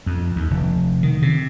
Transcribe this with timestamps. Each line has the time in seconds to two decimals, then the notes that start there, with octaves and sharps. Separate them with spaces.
0.06 F2
0.36 D#2
0.50 F1
1.03 D#3
1.22 C3